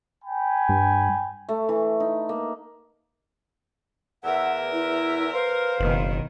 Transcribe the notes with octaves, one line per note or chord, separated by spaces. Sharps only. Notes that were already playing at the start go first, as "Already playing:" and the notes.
G5 G#5 B5
G2
A3
E3
D#4
A#3
E2 A#4 E5 F#5
E4
B4 C5 F5
F#1 B2 D#3